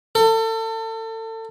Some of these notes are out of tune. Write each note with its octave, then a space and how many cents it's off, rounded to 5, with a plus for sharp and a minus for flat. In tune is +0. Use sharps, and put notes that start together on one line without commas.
A4 +30